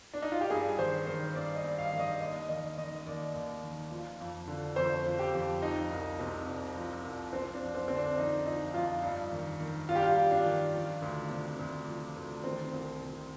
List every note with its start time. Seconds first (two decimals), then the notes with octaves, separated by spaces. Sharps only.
0.14 D4
0.22 D#4
0.32 F4
0.41 G4
0.50 G2 G#4
0.78 D#3 C5
1.07 D#3 C5
1.35 G2 D5
1.56 D#5
1.64 G2
1.78 F5
1.92 D#3
1.99 D#5
2.21 D#2 D#5
2.49 D#3 D#5
2.77 D#3 D#5
3.06 D#2 D5
3.35 D#2
3.63 D#3
3.91 F3
4.20 F2
4.47 D3
4.76 F2 C5
5.05 F3
5.19 G4
5.34 F2
5.62 F3 D#4
5.91 C2
6.19 C3
6.47 C2
6.76 F3
7.04 C2
7.32 F3 C4
7.54 D4
7.61 F2
7.75 C4
7.88 D3 C4
7.96 D4
8.18 F2 D#4
8.46 F3 D#4
8.74 F2 F4
9.03 G2
9.32 D#3
9.60 D#3
9.89 G2 F4
9.96 G4
10.02 F4
10.17 G2
10.31 D4
10.46 D#3
10.74 F3
11.02 D2
11.30 C3
11.59 D2
11.87 F3
12.16 D2
12.44 D#3 C4
12.73 C2
13.01 C3